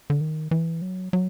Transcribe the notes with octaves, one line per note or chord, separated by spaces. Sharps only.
D3
D#3
E3
F#3
F#3